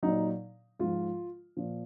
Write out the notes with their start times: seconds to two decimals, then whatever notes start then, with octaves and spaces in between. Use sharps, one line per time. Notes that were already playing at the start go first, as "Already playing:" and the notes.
0.03 A#2 F#3 D#4
0.79 G#2 F3 F4
1.57 A#2 F3